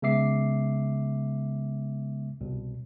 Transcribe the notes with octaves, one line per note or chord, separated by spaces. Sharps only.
C#3 G#3 B3 E5 D6 C7
C2 B2